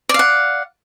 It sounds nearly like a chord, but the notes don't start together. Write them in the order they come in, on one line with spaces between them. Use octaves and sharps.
D5 F5 F#5